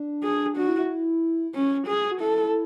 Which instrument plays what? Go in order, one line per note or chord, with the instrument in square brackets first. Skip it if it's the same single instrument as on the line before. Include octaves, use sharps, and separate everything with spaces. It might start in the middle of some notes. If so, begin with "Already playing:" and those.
Already playing: [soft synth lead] D4
[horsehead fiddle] G#4
[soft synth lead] D4 [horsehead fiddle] F#4
[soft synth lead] E4
E4
[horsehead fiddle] C#4
G#4
[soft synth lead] F#4
[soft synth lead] E4 [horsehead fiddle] A4